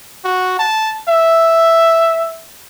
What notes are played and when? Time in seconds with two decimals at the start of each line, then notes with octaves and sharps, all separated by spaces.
0.24 F#4
0.59 A5
1.08 E5